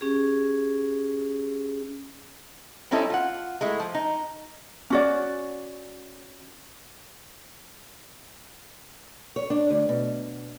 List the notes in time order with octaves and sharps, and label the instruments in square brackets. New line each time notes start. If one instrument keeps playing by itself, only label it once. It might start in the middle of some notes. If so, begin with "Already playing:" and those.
[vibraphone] C#4 G4 G#4
[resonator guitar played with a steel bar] G3 C4 C#4 D#4 E4 A4
F4 F#5
G#3 A3 E4
F3
D#4
[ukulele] C#4 F#4 D5
[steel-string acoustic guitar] C#5
D4
D2
B2